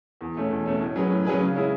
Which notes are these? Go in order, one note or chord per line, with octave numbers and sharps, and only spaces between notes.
E2
B2 A3 C#4
E2
B2 A3 C#4
A2
F#3 C#4 G#4 B4
A2
F#3 C#4 G#4 B4
C#3
G#3 C#4 E4 G#4